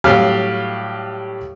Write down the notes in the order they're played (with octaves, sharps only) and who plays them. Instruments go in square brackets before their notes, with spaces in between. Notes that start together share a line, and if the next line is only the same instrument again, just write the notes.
[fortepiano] A2 F#3 G3 G4 F5 F6